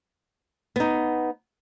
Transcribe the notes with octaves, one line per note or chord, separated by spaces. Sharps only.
B3 D#4